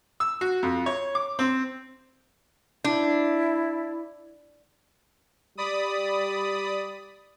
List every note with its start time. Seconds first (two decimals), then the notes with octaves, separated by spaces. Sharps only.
0.20 E6
0.41 F#4
0.63 F2
0.86 C#5
1.15 D6
1.39 C4
2.84 D4 E4
5.57 G3 D5 B5 D#6